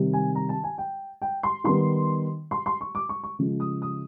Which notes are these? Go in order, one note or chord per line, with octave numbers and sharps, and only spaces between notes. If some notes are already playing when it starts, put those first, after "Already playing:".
Already playing: C3 D#3 G3
G#5
A#5
A5
G#5
G5
G5
C6
D#3 G3 B3 C6
C6
C6
C#6
D6
C#6
C#6
C#3 F3 G#3
D#6
D#6